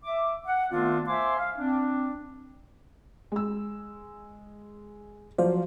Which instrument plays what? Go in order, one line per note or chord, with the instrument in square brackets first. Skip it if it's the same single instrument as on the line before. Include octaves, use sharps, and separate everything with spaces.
[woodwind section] E5 D6
F#5
D#3 A3 B3 C4 D4 F4
C5 E5 F5 G#5 C6 D6
F5
C4 D4
[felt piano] G#3 E6
[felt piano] F3 F#3 [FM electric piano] C5 D5 F5